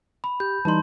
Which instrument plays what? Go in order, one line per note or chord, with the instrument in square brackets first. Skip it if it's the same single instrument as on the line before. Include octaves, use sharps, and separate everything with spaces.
[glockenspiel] B5
[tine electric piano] G4 [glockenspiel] G6
[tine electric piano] E3 G3 D#4 [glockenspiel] A5 C6